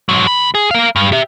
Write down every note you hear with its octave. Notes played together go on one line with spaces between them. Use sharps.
G#2 F#3
C#2 B5
G#4
A#4 F5
G2
G4 E5